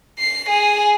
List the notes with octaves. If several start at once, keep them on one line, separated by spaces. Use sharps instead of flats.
C7
G#4